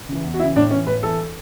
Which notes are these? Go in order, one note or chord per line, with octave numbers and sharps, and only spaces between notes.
C#3 E3
E2
F#4
C#3 E3 E4
A2 D4
E3 C#4
A2 B4
E3 A4